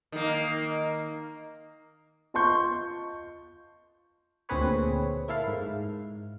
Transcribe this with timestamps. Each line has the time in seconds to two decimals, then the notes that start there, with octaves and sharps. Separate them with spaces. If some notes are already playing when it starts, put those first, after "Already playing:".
0.12 D#3 A#3
2.34 F4 D#5 A5 C6 C#6 G6
4.49 D2 A#2 C4 G#4 B4 C#5
5.28 A#3 E4 A4 F5
5.48 G#2